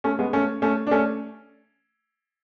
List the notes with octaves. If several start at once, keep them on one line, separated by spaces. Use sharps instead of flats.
A3 C#4
G#3 B3
A3 C#4
A3 C#4
D4
A3 C#4